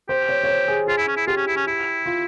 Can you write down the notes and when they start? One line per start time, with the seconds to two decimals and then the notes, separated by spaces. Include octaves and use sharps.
0.09 G4 C5
0.29 C#5
0.44 C#5
0.49 C5
0.68 G#4
0.87 F4 G#4
0.97 E4
1.08 C#4
1.17 E4
1.27 F4 G4
1.37 C#4
1.47 E4
1.56 C#4
1.67 E4
2.06 F4